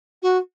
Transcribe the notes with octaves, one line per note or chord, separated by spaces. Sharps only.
F#4